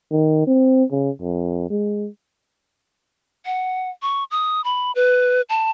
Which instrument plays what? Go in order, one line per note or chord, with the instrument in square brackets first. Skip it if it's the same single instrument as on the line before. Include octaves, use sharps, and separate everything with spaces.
[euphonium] D#3
C4
C#3
F2
G#3
[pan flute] F#5
C#6
D#6
B5
B4
A5